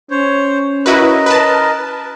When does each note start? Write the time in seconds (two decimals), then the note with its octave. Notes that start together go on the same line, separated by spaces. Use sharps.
0.11 C#4 C5 C#5
0.86 E4 F#4 A#4 B4 D#5
1.26 B4 A5